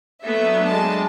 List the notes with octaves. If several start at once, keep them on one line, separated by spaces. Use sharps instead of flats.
F#3 A3 B3 D4 E5
G#3 G5 A5